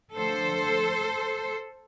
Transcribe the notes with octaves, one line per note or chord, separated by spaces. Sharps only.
D3 F3 A3 A4 C5